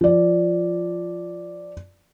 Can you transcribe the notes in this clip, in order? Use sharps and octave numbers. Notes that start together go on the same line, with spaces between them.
F3 D5